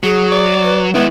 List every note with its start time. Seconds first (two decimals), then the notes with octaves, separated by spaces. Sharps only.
0.03 F#3 G#4
0.32 D5
0.64 B4
0.95 D#3 G#3 B3 E4